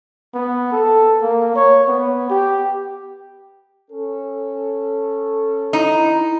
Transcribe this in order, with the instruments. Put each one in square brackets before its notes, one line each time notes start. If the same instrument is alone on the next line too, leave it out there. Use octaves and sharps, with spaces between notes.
[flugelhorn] B3
A4
A#3
C#5
B3
G4
[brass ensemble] C#4 A4
[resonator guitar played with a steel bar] D#4 [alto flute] E4